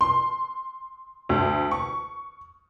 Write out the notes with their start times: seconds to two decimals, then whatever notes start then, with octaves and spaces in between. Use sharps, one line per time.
0.01 C6
1.29 D2
1.71 C#6